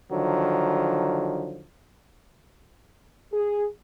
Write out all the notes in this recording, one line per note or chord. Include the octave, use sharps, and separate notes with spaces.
D3 D#3 F3 F#3
G#4